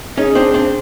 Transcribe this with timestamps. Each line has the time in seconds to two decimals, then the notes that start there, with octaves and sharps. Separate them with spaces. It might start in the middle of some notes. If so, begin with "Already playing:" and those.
0.18 C#4 D#4 G#4
0.35 C4 D4
0.54 C4 D4